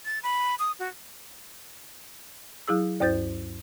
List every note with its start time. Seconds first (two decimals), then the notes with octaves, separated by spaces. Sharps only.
0.05 A6
0.23 B5
0.59 D#6
0.79 F#4
2.68 F#3 E4 G#4 E6
3.00 D2 G2 E4 C5 G6 A6